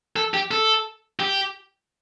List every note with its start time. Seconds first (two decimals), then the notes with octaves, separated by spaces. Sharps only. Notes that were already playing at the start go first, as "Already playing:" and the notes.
0.16 A4
0.34 G4
0.51 A4
1.20 G4